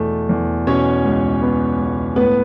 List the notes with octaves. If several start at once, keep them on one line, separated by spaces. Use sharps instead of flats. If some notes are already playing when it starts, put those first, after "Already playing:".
Already playing: E2 B2 A3
E2
B2 C#4 C#5
C#2
B3
C#2
A2 B3 B4